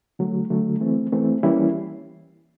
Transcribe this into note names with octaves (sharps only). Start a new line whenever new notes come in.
D3 F#3 A3
D3 F#3 A3
E3 A3 C4
E3 A3 C4
E3 G3 A#3 C#4 E4